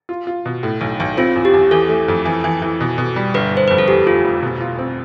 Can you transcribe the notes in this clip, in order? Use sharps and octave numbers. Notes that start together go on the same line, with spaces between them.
F4
F4
B2
A2
B1
B1
C4 F4
E2
G4
E2
E3 A4
A3
F2
E3
E3
E3
B2
B2
G3
G1 B4
G1 C5
F2 B4
A4
E2 G4
F1 F4
F1
B2
F4
C4